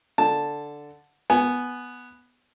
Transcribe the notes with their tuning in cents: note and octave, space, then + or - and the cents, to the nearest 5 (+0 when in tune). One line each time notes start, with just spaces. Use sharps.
D3 +0 A5 +0
B3 +0 G#5 +15